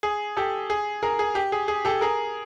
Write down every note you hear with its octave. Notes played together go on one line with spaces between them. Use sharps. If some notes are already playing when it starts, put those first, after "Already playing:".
G#4
G4 A4
G#4
G#4 A#4
G#4
G4
G#4
G#4
G4 A4
G#4 A#4